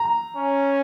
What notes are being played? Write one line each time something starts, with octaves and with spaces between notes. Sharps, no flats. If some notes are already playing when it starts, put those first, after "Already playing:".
Already playing: A#5
C#4